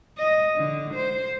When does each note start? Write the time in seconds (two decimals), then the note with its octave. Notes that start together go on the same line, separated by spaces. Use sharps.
0.18 D#5
0.57 D3
0.95 C5